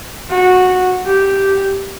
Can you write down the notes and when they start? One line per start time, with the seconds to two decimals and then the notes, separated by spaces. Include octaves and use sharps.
0.30 F#4
1.06 G4